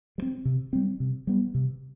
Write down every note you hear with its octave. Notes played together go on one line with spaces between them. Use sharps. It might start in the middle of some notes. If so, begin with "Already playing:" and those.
G3
C4
C3
G3 C4
C3
G3 B3
C3